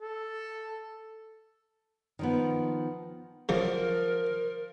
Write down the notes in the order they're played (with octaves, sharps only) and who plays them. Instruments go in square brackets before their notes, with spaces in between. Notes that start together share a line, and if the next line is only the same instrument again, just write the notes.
[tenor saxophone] A4
[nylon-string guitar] D#3 F3 B3
[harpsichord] C#3 F#3 [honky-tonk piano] F3 [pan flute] A#4